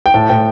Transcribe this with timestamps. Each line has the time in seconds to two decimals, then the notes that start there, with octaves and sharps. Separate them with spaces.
0.06 G5
0.14 A2 A5
0.30 A2 G5